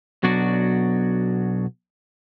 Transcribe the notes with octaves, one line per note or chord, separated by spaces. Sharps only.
B1 B2 F#3 D4 F#4 D5